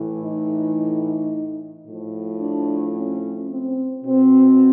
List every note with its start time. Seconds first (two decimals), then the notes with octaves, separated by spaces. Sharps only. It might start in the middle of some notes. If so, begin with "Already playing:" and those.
Already playing: A2 E3
0.22 D#4
1.86 A2 F3
2.41 D4
2.96 C#4
3.50 C4
4.04 B2 C4